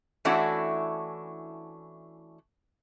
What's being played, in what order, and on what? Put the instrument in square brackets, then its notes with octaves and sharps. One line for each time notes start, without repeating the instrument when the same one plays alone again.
[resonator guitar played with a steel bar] E3 A3 C#4 D4 E4 F#4